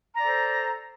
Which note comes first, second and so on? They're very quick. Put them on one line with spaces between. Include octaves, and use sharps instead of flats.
A#5 D5 A4 C5